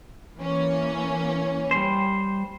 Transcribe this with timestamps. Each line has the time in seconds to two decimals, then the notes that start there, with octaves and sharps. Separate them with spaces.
0.37 E3 A#3 C#4
1.71 G3 C5